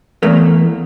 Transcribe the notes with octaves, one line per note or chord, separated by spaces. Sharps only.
E2 A3 A#3